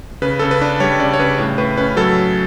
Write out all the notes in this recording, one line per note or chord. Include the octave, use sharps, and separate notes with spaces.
C#3 B4
C#3 A4
B4
D4
G3 C#5
C#3 D5
C#5
C#3 B4
A2 C#5
A2 B4
C#4 B4
F#3 A4